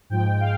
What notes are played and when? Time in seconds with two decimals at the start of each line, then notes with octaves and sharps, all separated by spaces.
0.10 G#2 F3 G#3 G5
0.36 G5
0.40 F5